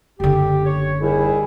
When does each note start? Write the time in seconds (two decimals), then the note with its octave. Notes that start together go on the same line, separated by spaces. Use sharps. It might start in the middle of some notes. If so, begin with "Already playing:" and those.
0.20 F#1 D3 G4
0.65 C#5
1.01 D#2 G3 E4 G#4